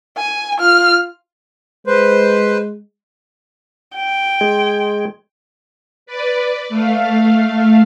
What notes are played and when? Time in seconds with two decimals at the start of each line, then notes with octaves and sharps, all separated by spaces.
0.17 G#5
0.59 F4 F6
1.87 G#3 B4 C5
3.95 G5
4.41 G#3
6.06 B4 D5
6.69 A3 F5